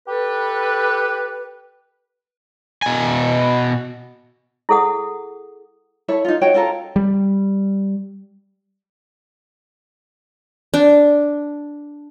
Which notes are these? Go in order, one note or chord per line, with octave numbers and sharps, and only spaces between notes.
G4 A4 B4
B2 G#5
E4 G#4 A4 F#5 D#6
E4 A4 C#5
D#4 F4
D#4 F#4 C#5 G5
C#4 F4 A4 A#4
G3
D4